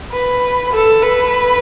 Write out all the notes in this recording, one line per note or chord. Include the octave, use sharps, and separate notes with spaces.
B4
A4
B4